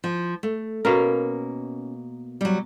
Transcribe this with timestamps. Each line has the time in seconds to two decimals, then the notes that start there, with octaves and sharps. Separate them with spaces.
0.04 F3
0.43 A3
0.85 B2 A#3 C#4 A#4
2.41 F#3 G3